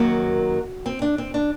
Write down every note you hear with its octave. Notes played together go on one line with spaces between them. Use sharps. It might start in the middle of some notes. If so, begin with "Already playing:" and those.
Already playing: F#2 D#3 F#3 A#3 F#4
C4
D4
C4
D4